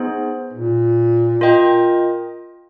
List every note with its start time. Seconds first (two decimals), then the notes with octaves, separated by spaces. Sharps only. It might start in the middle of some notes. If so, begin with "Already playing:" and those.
Already playing: B3 D#4 G#4 C5
0.53 A#2
1.41 F4 A#4 D#5 G5